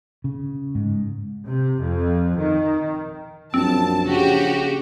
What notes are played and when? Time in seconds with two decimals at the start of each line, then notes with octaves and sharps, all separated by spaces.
0.24 C#3
0.75 G#2
1.47 C3
1.80 F2
2.39 D#3
3.54 A#1 F#2 C4 A5
4.06 C#3 F#4 G4